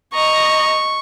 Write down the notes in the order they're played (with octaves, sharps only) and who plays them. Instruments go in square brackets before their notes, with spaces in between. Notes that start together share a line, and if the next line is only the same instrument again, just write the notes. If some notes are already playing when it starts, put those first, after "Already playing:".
[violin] D#5 A#5 [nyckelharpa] C#6